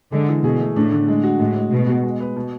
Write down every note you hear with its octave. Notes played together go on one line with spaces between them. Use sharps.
D3 G#3
E3
B2 G#4
A3
A2 D4
D3
G#3
F#4
A2 G#3
G#3
B2 B3
F#4
G#3
B4
B2